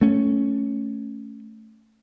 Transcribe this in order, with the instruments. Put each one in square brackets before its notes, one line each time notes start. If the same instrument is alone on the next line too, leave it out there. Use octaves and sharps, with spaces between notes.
[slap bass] A3 C#4